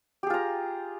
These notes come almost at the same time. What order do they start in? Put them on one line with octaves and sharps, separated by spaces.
G4 G#4 F4 A#5